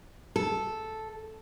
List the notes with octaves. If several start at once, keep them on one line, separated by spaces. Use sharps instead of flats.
A4